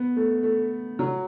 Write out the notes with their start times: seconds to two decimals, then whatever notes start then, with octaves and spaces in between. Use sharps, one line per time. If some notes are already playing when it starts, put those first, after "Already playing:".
Already playing: B3
0.17 A3
0.43 A3
0.99 F#3